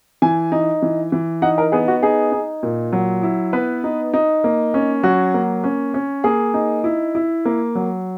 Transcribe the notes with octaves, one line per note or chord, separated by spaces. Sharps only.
E3 G#5
D#4
E3
E3
D#4 F#5
A#4
B3 G#4
F#4
D#4 G#4
D#4
A#2
F#3
E4
B3 B4
D#4
D#4
A#3
C#4
F#3 F#4
A#3
C#4
C#4
A#3 G#4
D#4
E4
E4
A#3
F#3